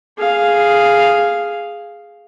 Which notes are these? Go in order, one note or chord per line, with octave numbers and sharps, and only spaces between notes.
G#4 F5